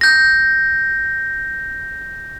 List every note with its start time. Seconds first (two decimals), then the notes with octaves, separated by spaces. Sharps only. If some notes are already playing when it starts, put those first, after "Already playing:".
0.01 G6 A#6